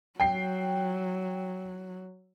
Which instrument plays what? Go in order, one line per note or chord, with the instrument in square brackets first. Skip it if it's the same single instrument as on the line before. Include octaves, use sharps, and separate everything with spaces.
[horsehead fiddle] F#3 [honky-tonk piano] G5 C7